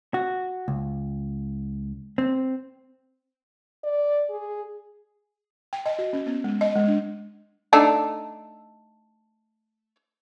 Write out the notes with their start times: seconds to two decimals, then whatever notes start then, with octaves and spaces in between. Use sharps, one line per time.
0.14 F#4
0.68 C#2
2.18 C4
3.84 D5
4.30 G#4
5.73 G5
5.86 D#5
5.99 F#4
6.13 C#4
6.26 B3
6.44 G#3
6.61 D#5
6.76 G#3
6.87 D4
7.73 A3 D4 D#4